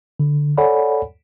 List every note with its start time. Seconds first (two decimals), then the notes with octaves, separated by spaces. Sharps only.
0.20 D3
0.58 A4 C#5 D5 F#5 G#5 B5